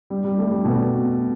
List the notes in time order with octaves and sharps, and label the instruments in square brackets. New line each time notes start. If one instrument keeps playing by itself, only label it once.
[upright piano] G3
G3
A3
G3
B2